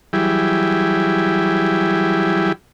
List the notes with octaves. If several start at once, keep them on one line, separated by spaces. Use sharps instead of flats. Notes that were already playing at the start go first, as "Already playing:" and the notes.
E3 F#3 G3 E4 G4 G#4